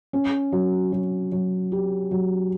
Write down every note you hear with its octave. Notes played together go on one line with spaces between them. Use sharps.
C#4
F#3
F#3
F#3
G4
F#3